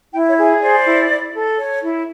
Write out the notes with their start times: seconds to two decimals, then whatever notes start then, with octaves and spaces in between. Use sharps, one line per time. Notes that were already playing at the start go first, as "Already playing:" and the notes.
0.12 E4 G5
0.28 C#5
0.37 G#4
0.61 C5 D5
0.85 E4
1.09 E4
1.33 A4
1.57 C#5
1.81 E4